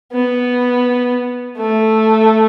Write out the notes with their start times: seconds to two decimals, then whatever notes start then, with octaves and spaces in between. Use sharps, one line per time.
0.12 B3
1.57 A3